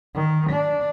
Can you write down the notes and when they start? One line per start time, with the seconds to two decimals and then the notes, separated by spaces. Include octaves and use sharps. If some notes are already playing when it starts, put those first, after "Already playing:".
0.15 D#3
0.50 D4